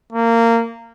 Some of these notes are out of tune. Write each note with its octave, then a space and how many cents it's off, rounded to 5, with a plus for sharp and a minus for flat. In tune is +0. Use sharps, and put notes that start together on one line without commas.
A#3 -20